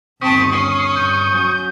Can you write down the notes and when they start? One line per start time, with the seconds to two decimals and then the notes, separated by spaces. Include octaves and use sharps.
0.22 G1 D#2 C4 A5 C#6 D#6 B6
0.52 C#4 C7
0.96 G2 G6
1.31 F#3 C#4